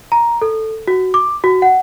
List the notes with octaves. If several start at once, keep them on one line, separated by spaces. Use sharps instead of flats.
A#5
A4
F#4
D6
F#4
F#5